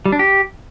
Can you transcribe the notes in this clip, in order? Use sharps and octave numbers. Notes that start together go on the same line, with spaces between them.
G3
D4
G4